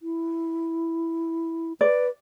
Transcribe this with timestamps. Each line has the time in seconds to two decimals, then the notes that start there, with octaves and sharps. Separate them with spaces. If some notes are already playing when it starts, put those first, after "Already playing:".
0.01 E4
1.81 B4 D5